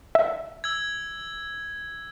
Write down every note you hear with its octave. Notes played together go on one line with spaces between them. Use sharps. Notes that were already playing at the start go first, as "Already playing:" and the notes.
E5
E6 G#6